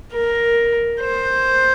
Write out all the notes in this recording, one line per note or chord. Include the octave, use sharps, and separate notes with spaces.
A#4
C5